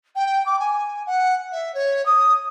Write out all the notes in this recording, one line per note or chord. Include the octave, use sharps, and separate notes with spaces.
G5
D6
G#5
F#5
E5
C#5
D#6